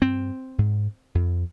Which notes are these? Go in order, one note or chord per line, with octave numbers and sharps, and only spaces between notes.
G2 C4
G#2
F2